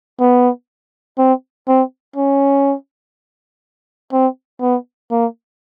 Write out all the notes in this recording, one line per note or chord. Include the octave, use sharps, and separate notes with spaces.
B3
C4
C4
C#4
C4
B3
A#3